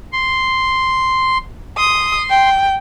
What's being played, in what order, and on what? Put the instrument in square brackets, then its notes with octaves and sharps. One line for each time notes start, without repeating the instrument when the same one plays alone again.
[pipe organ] C6
[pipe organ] C6 [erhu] D#6
[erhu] G5